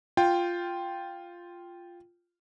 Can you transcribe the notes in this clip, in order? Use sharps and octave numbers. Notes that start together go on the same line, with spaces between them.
F4 G5